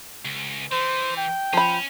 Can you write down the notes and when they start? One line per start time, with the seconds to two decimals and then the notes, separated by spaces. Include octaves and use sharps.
0.25 C#2
0.72 E3 C5
1.17 G5
1.53 F3 C#4 B5